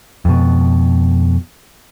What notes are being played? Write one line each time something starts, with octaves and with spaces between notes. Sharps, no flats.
F2 B2